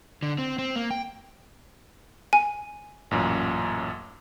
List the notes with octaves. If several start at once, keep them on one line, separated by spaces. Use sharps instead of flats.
D3
C4
C4
A#3
G5
G#5
A1 F#2 A#2